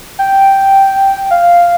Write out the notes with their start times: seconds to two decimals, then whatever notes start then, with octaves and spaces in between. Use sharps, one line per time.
0.19 G5
1.31 F5